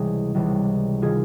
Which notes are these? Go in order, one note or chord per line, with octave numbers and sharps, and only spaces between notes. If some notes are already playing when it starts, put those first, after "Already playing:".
Already playing: C#2 C3 E3 G3 G#4
C#2 C3 E3 G3
D#3 G#3 C4 F4 G#4